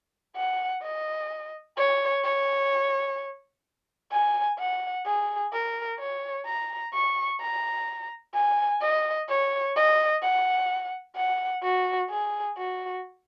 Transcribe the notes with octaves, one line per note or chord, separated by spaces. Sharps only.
F#5
D#5
C#5
C#5
G#5
F#5
G#4
A#4
C#5
A#5
C#6
A#5
G#5
D#5
C#5
D#5
F#5
F#5
F#4
G#4
F#4